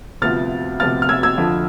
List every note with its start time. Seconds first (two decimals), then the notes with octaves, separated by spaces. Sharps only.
0.22 D2 C3 F3 B3 F4 F6 A6
0.80 D2 C3 F3 B3 F4 F6 A6
1.02 F6
1.09 E6 G#6
1.23 E6 G#6
1.38 F2 D3 F3